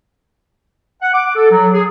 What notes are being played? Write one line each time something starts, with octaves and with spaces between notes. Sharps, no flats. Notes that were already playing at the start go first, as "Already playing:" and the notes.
F#5
D6
A4
F#3
G#4